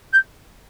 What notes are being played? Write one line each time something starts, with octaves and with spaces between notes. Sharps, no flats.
G6